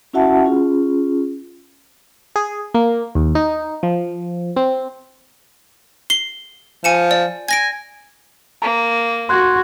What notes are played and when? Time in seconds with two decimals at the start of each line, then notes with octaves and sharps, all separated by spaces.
0.13 C#4 E4 F#4 E5 F#5 A5
0.44 C#4 F4 G#4
2.36 G#4
2.75 A#3
3.15 D#2
3.35 D#4
3.83 F3
4.56 C4
6.10 C7 G7
6.84 F3 G#5 C#7 E7
7.11 D5
7.48 G#5 G#6 A#6 D7
8.62 A#3 A#5
9.29 F#4 C6 F#6 G#6